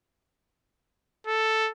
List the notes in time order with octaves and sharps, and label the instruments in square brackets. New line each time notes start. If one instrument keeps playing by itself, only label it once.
[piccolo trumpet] A4